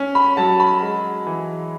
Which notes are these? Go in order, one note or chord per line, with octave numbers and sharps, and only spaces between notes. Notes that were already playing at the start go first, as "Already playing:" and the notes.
Already playing: C#4
B5
F#3 A5
B5
G#3
E3